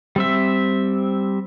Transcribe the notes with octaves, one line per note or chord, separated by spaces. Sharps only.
G3 C4 E5